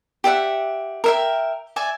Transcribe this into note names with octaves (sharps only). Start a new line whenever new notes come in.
G4 D5 E5 F#5
A#4 E5 G5
D5 E5 G#5